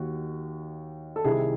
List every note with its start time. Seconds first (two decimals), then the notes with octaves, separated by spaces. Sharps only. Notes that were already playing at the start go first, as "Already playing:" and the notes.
Already playing: D#2 D#3 F#4
1.16 A4
1.24 C2 C3 D#3 E4 G#4